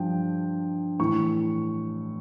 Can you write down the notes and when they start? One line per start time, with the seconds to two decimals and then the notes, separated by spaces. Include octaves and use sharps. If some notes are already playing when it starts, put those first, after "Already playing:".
Already playing: G2 F3 G5
0.99 A2 E3 C#6